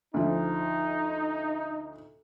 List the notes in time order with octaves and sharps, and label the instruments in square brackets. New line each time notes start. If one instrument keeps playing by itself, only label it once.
[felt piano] D2 F3 [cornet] D#4